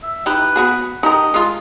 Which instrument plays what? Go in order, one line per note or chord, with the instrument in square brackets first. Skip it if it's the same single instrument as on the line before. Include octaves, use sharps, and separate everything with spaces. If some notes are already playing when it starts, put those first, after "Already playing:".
[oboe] E5
[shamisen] D#4 E4 G4 [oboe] B4
[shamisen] B3 F#4 G#4
[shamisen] D#4 G4 A#4 [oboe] D#5
[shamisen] G#3 F4